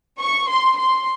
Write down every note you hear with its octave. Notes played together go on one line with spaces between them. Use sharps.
C#6
C6
C6